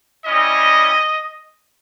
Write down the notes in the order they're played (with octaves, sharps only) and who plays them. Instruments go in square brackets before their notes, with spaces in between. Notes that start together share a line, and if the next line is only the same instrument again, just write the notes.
[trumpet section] G3 C#4 E4 D#5